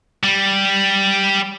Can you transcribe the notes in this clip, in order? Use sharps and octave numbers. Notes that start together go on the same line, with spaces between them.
G3